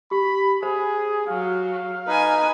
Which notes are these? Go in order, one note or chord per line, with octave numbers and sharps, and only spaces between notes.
G4 B5
G#4 C5
F#3 F5
D#4 B4 G#5